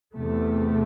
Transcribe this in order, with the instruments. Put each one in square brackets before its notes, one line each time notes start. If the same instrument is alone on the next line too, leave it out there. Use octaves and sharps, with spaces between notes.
[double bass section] E2 C3 A3